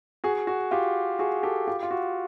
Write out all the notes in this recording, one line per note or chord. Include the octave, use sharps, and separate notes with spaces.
F#4 G#4
F#4
F4 G4
F#4 G#4
G4 A4
F4 G4
F4
F#4